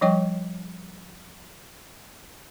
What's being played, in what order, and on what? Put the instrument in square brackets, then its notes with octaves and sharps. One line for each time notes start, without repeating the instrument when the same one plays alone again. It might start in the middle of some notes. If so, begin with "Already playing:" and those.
[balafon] F3 G3 C#5 D#5 G5 C#6